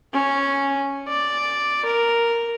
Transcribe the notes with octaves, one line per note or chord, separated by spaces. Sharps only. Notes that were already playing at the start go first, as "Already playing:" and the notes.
C#4
D5
A#4